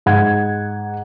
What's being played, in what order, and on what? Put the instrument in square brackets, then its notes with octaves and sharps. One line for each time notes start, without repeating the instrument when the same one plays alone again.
[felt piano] G#2 F#5 G#6